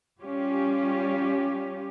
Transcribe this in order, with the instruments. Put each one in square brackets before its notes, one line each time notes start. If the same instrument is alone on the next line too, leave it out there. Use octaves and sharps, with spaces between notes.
[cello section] G3 C#4 F4 G4